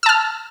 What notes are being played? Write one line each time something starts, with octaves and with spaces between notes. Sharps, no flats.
A5 E6 F6